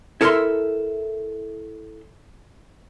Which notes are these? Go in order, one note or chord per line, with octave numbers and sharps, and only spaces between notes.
E4 A4 A#4 D#5 E5 C6